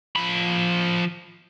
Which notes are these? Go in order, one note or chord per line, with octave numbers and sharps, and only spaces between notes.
F3 B5